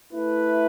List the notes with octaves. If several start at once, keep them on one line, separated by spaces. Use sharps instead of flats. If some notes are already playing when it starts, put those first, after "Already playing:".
A3 E4 B4